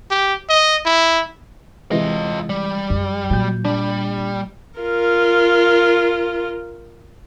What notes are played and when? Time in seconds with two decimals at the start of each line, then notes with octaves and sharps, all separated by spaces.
0.11 G4
0.49 D#5
0.86 E4
1.91 C3 E3 G#3 F4 D#5
2.50 G3
2.90 F#2
3.30 A#2 F#3 G6
3.65 G3 D4
4.79 F4 A#4